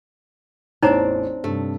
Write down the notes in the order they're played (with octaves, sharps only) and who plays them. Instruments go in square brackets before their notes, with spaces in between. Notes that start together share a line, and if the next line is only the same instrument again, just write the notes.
[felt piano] A1 E2 [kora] C4 D4 D5 [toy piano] D#4 C#5 A#5
[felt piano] G2 C3 [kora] A3